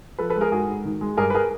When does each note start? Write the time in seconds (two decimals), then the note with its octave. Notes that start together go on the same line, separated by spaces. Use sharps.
0.19 F3 A4 B4
0.30 A4 B4
0.36 G#3
0.41 G#4 A#4
0.52 G#2 F#4 G#4
0.68 G#2
0.85 D#3
1.01 G#3
1.17 G2 G#4 A#4
1.30 B4
1.35 G#4 A#4